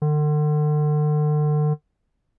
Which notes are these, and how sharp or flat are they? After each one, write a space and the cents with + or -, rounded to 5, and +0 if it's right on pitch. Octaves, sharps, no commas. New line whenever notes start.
D3 +40